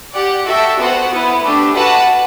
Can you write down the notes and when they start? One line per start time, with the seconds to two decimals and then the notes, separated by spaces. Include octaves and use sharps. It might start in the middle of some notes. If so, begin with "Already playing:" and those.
0.13 G4 D5 F#5
0.45 F#4 A4 E5 G5
0.78 B3 F#4 C5 F#5
1.10 B3 E4 B4
1.42 A3 D4 G4
1.75 F#4 B4 F#5 A5